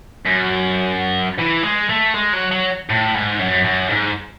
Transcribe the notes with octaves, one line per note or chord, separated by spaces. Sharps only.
F#2
E3
G#3
A3
G#3
F#3
F#3
A2
G#2
F#2
F#2
G#2